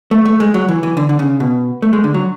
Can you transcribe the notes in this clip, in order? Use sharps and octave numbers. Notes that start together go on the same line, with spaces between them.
A3
A3
G#3
F#3
E3
E3
D3
D3
C#3
B2
A3
G#3
D3
F#3